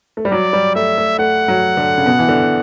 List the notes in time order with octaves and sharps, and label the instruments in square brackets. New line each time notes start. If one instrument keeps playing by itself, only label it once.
[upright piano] A3
G3
[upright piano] F#3 [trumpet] D5
[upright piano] G3
[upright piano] A3 [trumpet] E5
[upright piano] A3
[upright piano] A3 [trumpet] F#5
[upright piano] F#3
D3
C#3
B2
E3
D3